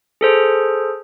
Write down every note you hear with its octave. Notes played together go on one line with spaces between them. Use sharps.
G#4 A4 C5